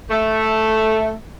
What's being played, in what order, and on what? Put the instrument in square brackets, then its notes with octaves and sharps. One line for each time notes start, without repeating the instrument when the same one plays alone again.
[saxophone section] A3